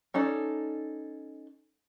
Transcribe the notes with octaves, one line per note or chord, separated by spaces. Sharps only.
C#4 D#4 A4 D5